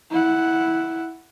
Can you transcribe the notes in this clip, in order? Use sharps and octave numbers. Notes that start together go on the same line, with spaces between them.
E4 F#5